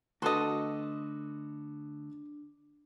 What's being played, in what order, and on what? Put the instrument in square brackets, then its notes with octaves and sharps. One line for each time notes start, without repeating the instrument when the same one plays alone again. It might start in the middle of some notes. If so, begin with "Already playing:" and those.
[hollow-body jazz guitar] D2 A5 [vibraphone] D4 [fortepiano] F#4 A4 B4 [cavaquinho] D#5 C6